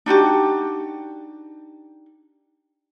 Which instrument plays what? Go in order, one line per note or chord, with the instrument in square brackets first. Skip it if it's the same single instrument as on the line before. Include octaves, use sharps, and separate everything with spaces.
[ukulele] D4 D#4 F#4 G4